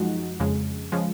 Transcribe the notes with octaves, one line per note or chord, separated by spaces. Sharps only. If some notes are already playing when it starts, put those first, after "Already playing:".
Already playing: F#2 F3 G#3 D#4 F#4
F2 C#3 G#3
C#3 F3 G#3